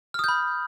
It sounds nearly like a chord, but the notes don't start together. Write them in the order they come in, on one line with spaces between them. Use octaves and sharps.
F6 D#6 G6 B5